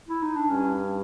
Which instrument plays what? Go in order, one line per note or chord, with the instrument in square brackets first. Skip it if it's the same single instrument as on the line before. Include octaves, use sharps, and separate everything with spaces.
[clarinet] E4
D#4
D4
[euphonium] G2 [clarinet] C#4